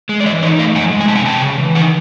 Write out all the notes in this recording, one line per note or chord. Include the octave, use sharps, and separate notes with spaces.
G#3
D5
E3 C#5 D#5
D#4 C#5 D#5
A3 D#5 F5
F2 F#5 G#5
G#3
G#5
C3 A5
F#5 G#5
C#3 G5 A5
C#3
E3
D#3 F#5 G#5